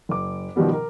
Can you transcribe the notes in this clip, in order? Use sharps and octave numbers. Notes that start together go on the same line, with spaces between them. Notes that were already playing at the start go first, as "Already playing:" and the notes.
F#1 D6
B2 D#3 F3 G3 B3
A#4